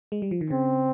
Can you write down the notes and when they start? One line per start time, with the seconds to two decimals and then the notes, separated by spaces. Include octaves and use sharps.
0.12 G#3
0.22 G3
0.31 F3
0.41 D#3
0.50 C#3 C4